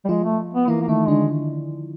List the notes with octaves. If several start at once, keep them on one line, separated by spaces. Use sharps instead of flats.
G3
F3 G#3 F4
A3
B3
E3 A#3 E4
A#3
D#3 A3 D#4
D3 G#3 D4